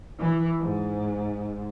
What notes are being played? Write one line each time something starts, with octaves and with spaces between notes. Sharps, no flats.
E3
G#2